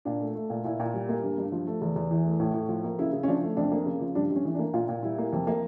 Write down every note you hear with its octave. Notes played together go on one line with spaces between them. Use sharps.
A#2 D4
A3
A3
A#2
A#2 E4
A#2
G3
A#3
G2
G2
F3
A3
E2
E2
E3
A3
A2
A2
F3
A#3
C#3 E4
C#3
C#4
F3 D4
A3
F2 D4
A#3
C#3
F3
G2 D4
G2
C#4
E3
D4
A#3
A#2 F4
A#2
G3 E4
A#3
F2
A#3